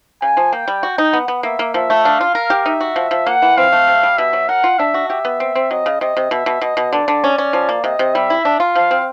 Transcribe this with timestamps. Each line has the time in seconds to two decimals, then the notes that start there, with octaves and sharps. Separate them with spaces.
0.22 C#3 G#5
0.37 F3
0.52 A#3 G5
0.68 G3
0.83 F#4
0.98 D#4
1.13 B3 F#5
1.28 B3
1.43 A#3 E5
1.59 A#3
1.74 F3 E5
1.90 A3
2.04 D4 F5
2.21 F4
2.35 A#4
2.50 G4
2.65 D#4 E5
2.80 F#4
2.96 F3
3.11 F3
3.27 A#3 F#5
3.42 E3
3.57 C4 F5
3.72 A3
3.88 C3
4.03 G3
4.18 B2 E5
4.33 F#3
4.49 A#4 F#5
4.64 F4
4.79 D4 E5
4.94 F#4
5.09 G4 E5
5.25 B3
5.40 C4
5.55 C4
5.71 F#3 D#5
5.86 C#3
6.01 C3 D#5
6.17 C3
6.31 B2 E5
6.46 B2
6.61 B2 D#5
6.77 B2
6.92 D3 D5
7.08 D3
7.24 C#4
7.38 C#4
7.53 F3
7.69 A#3
7.84 C3 D#5
7.99 C3
8.15 G3 E5
8.30 E4
8.45 D4
8.60 F4
8.75 F3 F5
8.91 C4